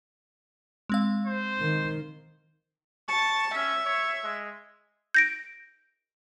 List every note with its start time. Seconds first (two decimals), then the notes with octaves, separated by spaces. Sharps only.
0.89 G#3 C4 F5
1.26 C5
1.61 D#3
3.09 A5 C#6
3.55 C#4 E5
3.85 C#5
4.24 G#3
5.14 G6 A#6 D7